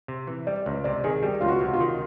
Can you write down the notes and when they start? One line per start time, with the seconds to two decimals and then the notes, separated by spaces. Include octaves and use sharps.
0.08 C3
0.27 E3
0.47 G3 D5
0.66 C#2
0.84 C3 D5
1.04 D#3 G#4
1.23 G3 G4
1.40 C#2 F4
1.48 F#4
1.61 C3
1.74 F4
1.80 D#3